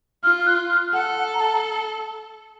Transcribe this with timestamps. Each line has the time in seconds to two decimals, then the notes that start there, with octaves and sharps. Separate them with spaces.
0.23 F4 F6
0.47 F#6
0.70 F6
0.94 A4 F#5
1.17 F#5
1.34 A#5
1.40 A5